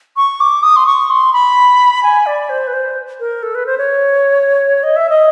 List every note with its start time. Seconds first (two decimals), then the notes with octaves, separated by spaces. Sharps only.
0.17 C#6
0.40 D6
0.63 D#6
0.76 C6
0.86 C#6
1.10 C6
1.33 B5
2.03 G#5
2.26 D5
2.50 C5
2.67 B4
2.74 C5
3.20 A#4
3.43 A4
3.55 B4
3.66 C5
3.78 C#5
4.83 D#5
4.96 E5
5.09 D#5